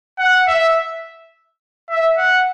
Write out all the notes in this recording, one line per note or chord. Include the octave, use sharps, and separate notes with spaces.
F#5
E5
E5
F#5